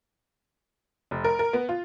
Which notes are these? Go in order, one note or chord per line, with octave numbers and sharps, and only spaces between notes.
F1
A#4
A#4
B3
F4